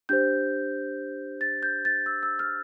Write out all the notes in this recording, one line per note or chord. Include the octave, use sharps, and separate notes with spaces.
D4 G4 C5 G6
A6
G6
A6
E6
E6
F6